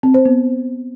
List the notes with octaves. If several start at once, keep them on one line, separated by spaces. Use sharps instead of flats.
C4
C5
B3